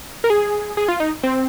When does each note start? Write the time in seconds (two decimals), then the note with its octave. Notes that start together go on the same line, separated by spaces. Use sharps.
0.24 A#4
0.30 G#4
0.77 G#4
0.88 F4
1.00 D#4
1.23 C4